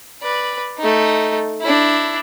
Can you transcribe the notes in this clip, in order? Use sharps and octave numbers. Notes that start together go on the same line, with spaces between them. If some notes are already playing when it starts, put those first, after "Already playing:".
B4 D5
A3 D#4
D4 E4